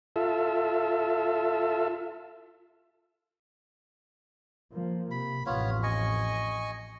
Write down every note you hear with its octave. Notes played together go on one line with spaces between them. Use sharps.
F4 A4 E5
F3 A#3
C3 B5
A1 F2 B3 F4 C#5
D#5 G#5 C#6